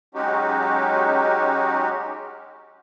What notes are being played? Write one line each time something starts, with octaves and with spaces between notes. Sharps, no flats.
F#3 G#3 C#4 D#4 F#4 G4